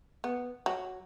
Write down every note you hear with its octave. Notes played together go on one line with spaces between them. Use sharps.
B3
F#3